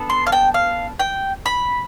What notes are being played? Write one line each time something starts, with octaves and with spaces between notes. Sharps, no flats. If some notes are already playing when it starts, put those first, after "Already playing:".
Already playing: B3 D4 A4
C6
F5
G5
F5
G5
B5